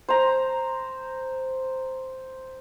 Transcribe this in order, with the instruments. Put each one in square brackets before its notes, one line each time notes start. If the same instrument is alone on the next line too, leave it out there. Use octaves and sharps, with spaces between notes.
[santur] C5 A#5